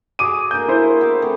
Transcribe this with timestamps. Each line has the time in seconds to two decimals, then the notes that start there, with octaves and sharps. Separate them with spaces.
0.19 F#4 G#4 D6 D#7
0.51 A#3 D4 A#4 G6
0.68 E4 C5 E5
1.01 B3 D6
1.22 A3 C4 F#4